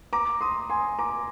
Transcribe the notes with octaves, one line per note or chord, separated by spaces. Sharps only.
A#5 D6
C6 D#6
G#5 C6
A#5 D6